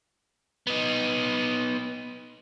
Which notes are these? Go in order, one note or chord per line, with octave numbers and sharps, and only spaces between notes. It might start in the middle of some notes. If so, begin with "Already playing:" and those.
B3 D#4